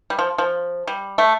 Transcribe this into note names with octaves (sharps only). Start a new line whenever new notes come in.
G3
F3
F3
G3
A3